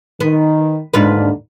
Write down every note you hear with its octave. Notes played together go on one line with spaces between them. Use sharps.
D#3 B3
D#2 G#2 D3 D4 F4 B4